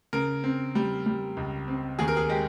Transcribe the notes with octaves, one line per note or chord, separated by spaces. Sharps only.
C#3 A#4
C4
G3
G3
C#2
C4
D#2 G#4
A#4
G#4
G#3 G4